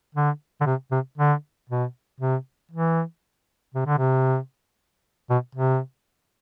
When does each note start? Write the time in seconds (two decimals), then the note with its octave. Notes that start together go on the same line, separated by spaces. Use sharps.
0.15 D3
0.61 D3
0.66 C3
0.92 C3
1.18 D3
1.70 B2
2.20 C3
2.71 E3
3.74 C3
3.86 D3
3.98 C3
5.30 B2
5.55 C3